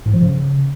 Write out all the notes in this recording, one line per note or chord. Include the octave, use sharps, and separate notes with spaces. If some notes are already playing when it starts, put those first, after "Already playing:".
G#2
F3
C#3